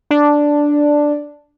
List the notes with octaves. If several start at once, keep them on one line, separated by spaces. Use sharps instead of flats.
D4